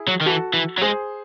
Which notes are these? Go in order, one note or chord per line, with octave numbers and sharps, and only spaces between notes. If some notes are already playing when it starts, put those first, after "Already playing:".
Already playing: E4 G#4
F#3
D#3
E3 F#4 A4
E3
F#3
G#3 G#4 C5